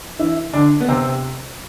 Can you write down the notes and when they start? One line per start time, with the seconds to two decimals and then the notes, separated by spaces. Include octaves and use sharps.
0.19 E3 E4
0.53 D3 D4
0.80 B3
0.88 C3 C4